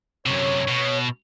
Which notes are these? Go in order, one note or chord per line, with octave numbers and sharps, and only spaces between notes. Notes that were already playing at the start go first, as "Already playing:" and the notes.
F#2 C3 C#5
B2